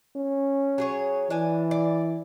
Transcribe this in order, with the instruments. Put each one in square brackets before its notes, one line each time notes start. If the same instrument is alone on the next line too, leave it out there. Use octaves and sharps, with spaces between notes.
[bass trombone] C#4
[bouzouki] F#3 G#4 C#5
[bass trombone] E3 [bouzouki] D4 G#5
[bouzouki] D5